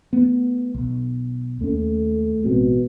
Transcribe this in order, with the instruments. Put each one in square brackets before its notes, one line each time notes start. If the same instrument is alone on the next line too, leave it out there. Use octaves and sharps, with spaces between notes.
[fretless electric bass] A3 B3
B1
[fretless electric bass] D#2 C#4 [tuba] A3
[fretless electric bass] A1 G#3 C4 [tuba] B2